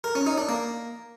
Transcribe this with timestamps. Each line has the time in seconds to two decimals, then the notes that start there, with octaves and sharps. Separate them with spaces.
0.04 A#4
0.15 C#4
0.26 D#4
0.38 D4
0.49 A#3